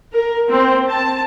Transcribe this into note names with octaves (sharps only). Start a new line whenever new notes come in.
A#4
C4
A5